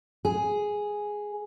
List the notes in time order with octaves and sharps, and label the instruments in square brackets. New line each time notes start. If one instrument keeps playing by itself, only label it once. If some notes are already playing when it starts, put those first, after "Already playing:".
[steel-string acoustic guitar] G#4